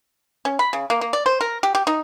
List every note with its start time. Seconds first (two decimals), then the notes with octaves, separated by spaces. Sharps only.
0.45 C#4
0.59 B5
0.73 C#3
0.90 A#3
1.01 A#3
1.13 D5
1.26 C5
1.41 A#4
1.63 G4
1.75 G4
1.87 D#4